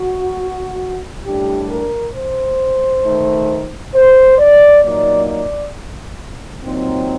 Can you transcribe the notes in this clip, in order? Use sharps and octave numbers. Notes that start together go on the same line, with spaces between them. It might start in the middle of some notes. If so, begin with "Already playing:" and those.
Already playing: F#4
A2 G3 D4 G4
A#4
C5
D#3 A3 D#4
C5
D5
A#2 F#3 A#3 D#4 D5
D5
A#2 F#3 C4 D#4